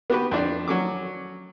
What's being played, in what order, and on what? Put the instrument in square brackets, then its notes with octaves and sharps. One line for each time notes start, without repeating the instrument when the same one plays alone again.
[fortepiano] B3 F#4 G4 B4
F2 D4 D5
F#3 C#4 D6